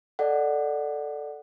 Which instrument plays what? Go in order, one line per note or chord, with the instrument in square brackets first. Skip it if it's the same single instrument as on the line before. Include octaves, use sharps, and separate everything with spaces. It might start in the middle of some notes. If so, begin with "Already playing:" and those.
[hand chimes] A4 D5 D#5 F#5